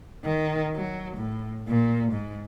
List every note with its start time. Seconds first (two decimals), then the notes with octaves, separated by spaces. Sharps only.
0.24 D#3
0.75 F#3
1.17 A2
1.68 A#2
2.12 G#2